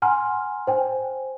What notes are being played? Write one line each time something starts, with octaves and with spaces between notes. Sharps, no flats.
F#5 G#5 A#5 C6 F6
C5 G5 G#5